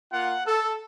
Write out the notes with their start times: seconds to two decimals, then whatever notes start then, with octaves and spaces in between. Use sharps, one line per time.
0.11 A#3 F4 F#5
0.45 A4